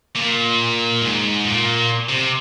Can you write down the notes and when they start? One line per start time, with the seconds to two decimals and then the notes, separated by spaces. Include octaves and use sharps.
0.16 A#2
1.02 G#2
1.44 A#2
2.09 C3